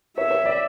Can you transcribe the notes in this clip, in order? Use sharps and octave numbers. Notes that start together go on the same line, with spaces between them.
C#5 E5
C#5
D5